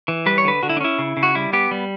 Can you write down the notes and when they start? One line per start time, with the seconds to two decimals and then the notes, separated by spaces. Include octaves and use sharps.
0.08 E3
0.26 G3 B4
0.38 C#5
0.45 D3 B4
0.63 D3 F#4
0.70 E4
0.77 D4
0.81 C#4 E4
0.98 C#3
1.17 C#3
1.23 F#4
1.35 G3 E4
1.53 B3 G4
1.71 G3